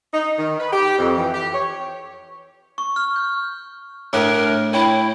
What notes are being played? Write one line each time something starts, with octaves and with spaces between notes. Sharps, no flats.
D#4
D#3
B4
G4
F2
E3
G4
C#5
C#6
F6
G6
A2 A3 D4 A#4 F#6
E4 C#5 G5 B5